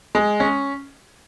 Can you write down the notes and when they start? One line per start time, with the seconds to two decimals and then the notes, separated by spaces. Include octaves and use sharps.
0.15 G#3
0.40 C#4